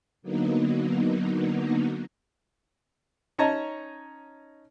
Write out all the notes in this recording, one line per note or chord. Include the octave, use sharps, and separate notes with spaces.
D3 F#3 A#3 B3 D#4
C#4 D#4 C#5 D#5 A5 A#5